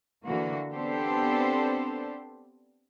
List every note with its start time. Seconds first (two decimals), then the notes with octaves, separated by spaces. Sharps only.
0.25 D3 E3 A#3 F#4
0.72 B3 C4 D4 G4 A4 C5